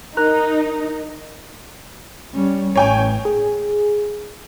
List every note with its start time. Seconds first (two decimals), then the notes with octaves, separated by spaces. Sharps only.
0.17 D#4 A#4 F#6
2.34 G3 C#4
2.76 A1 C#5 G5 G#5
3.25 G#4